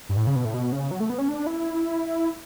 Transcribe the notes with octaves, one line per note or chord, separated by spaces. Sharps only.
G2
A2
C#3
B2
A2
B2
C#3
F#3
A3
B3
C#4
D4
E4